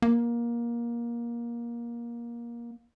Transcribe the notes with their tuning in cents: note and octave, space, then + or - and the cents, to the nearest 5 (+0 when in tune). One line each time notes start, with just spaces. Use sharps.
A#3 +20